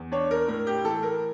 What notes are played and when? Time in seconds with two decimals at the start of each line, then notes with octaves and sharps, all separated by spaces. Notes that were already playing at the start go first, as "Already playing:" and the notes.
Already playing: E2
0.12 D4 C#5
0.31 A#4
0.48 A2 A#4
0.67 G4
0.84 E3 A4
1.03 A#4